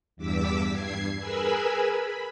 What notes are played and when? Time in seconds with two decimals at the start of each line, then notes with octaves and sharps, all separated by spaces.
0.16 E2 G2 D6 E6 B6
0.71 G2 G#6 C7
1.19 G#4 A#4 B4 G#5 B5 E6
1.96 B5